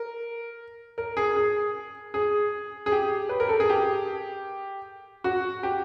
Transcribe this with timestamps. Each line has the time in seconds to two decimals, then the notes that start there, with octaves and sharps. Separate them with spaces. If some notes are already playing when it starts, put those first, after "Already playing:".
Already playing: A#4
0.98 A#4
1.17 G#4
1.36 G#4
2.14 G#4
2.86 G#4
2.92 G4
3.29 B4
3.40 A#4
3.49 A4
3.60 G#4
3.69 G4
5.24 F#4
5.63 G4